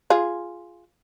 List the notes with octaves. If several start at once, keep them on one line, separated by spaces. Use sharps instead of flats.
F4 G#4